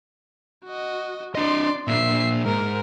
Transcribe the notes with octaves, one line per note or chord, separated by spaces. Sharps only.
F#4 D#5
D4 D5 D#5 C6
A#2 D4 E5 C7
G#2 A#4